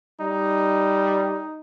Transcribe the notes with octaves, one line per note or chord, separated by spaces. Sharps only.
G3 D#4